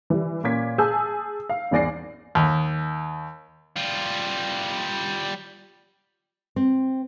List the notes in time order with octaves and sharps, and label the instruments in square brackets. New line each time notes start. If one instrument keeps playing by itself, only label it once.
[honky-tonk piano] E3 G3
A#2 C#4 D6 G#6 B6
G#4 G#5 A5 E6 G6
F5
G#1 E2 D5 A#6 C7
[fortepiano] D#2
[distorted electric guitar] G3 F4
[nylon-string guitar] C4